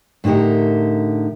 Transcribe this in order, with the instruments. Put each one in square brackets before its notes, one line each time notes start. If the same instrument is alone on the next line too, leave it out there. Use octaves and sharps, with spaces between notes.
[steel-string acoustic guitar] A2 D3 D#4 G4 A#4